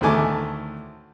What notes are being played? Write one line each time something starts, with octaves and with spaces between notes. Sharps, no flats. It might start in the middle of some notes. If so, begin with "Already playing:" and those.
D2 A2 D#3 A3 G#5 D6